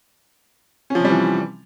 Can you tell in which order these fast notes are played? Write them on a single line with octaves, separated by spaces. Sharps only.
C#4 F3 C3 G3 E3